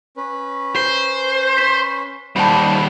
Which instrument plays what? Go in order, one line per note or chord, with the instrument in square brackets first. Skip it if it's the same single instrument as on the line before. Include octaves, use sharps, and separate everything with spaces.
[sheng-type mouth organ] C#4 B4
[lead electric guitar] C5
[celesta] B6 E7
[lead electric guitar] D#2 G3 [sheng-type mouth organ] C5 C#5 F#5 [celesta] A5 B5